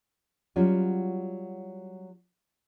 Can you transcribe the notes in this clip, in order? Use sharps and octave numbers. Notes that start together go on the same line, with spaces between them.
F#3 G3 C#4 F4 F#4